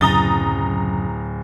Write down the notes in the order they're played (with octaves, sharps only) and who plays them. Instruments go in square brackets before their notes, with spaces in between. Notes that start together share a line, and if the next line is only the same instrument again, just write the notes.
[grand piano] D1 G7 [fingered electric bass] F#2 C#3 [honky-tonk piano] A#5 D#6 A6